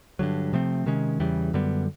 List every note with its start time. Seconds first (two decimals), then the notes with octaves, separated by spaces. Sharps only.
0.19 G2 D3 F#3
0.53 C3 F3 A3 C4
0.86 C3 D#3 G#3 C#4
1.20 E2 C#3 E3 G3
1.53 F#2 D3 G3 B3